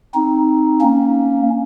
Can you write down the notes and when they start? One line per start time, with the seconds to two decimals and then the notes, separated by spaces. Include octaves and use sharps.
0.14 C4 D#4
0.81 A#3 C#4